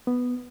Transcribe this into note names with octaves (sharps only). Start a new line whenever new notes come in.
B3